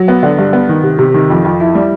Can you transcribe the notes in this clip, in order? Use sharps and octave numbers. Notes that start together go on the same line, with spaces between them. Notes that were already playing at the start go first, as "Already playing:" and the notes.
Already playing: F#3
B3
D3
G2
B3
D#3
C3
C3
D#3
F2
F2
E4
G3